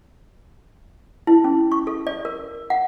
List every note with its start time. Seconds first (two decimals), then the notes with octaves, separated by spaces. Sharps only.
1.27 E4
1.44 C#4
1.72 C#6
1.87 A4
2.07 D5
2.25 A#4
2.70 F#5